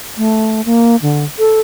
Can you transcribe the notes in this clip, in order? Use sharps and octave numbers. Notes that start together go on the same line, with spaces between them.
A3
A#3
D3
A4